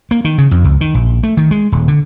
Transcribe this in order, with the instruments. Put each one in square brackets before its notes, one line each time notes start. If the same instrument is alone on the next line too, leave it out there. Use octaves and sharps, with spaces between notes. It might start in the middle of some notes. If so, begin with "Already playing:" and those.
[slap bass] A#3
D#3
C#3
F2
C#2
D#3
A#1
A3
D#3
G#3
D#1
D3